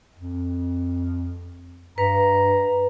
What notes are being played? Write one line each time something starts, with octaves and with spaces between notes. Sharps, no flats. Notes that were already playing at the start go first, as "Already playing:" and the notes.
F2
G2 B4 A#5